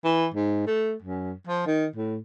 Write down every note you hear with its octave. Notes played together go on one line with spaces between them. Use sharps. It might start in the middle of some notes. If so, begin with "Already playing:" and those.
E3
G#2
A3
F#2
F3
D#3
A2